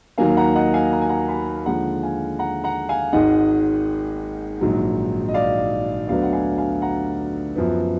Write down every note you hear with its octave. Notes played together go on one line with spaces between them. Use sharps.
D#2 D#3 F#3 A#3 F5 G#5
F#5 A#5
D#5 F#5
F5 G#5
A#5
G#5
F#5 A#5
G#5 B5
D#2 D3 F3 G#3 F#5 A#5
F5 G#5
F#5 A#5
F#5 A#5
F5 G#5
G#1 G#2 D#3 G#3 D#5 F#5
A#1 G#2 D#3 F#3
D#5
D5 F5
D2 D3 F#3 B3 D5 F5
F#5
F5 G#5
F5 G#5
F#5 A#5
F#2 F3 B3